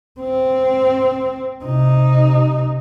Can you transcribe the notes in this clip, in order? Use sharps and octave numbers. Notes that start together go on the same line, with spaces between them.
C4
C3 D#4